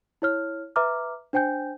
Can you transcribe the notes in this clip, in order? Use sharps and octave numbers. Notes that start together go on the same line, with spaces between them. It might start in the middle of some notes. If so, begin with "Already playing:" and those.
E4 C#5 F6
B4 E5 A#5 D6 F6
D4 C5 G5 G#5 G6